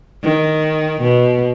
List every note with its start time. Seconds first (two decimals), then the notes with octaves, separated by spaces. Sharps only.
0.24 D#3
1.02 B2